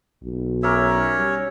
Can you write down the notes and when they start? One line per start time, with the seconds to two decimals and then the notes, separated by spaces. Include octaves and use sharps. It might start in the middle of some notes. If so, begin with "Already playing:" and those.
0.23 B1
0.63 C#4 A#4 C#5 D5 E5
1.17 G3